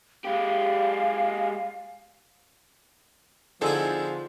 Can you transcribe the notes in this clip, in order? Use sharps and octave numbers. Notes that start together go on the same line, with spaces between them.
G#3 G4 F5
D3 F3 C4 D#4 E4 G#4 A4 C5